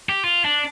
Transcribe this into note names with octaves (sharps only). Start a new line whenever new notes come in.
G4
F4
D4